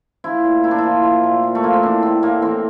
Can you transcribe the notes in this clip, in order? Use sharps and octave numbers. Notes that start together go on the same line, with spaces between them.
F3 E4
A#2
A#2 E4
D4
E4
F3
F3
A#2
A#2
A3
F3 A#3
C4
E3 D4
A2 C4
A2 A#3
E3 C4